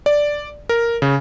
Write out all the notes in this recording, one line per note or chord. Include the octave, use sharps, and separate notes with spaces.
D5
A#4
C#3